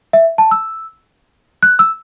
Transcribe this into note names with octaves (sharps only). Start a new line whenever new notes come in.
E5
A5
E6
F#6
E6